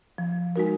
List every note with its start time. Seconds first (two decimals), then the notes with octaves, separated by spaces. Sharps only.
0.18 F3
0.56 G#3 D#4 F#4 A#4